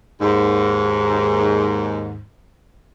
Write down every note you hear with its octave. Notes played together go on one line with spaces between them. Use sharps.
D#2 G#2